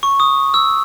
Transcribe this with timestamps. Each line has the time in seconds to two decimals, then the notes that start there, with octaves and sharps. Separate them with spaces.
0.03 C#6
0.20 D#6
0.54 E6